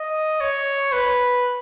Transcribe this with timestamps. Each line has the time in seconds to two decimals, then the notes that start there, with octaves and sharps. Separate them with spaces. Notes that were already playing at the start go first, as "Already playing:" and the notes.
Already playing: D#5
0.41 C#5
0.93 B4